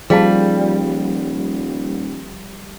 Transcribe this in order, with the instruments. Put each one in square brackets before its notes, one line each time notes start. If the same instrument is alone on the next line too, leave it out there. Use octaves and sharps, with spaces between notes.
[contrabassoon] D#1 [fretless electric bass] F3 [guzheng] G3 [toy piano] G#4 F5 A5